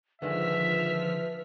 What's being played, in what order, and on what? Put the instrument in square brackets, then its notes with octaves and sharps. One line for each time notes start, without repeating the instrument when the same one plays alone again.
[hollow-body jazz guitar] D3 D#3 G#3 [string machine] F3 F6 B6 [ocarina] B4 [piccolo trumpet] E5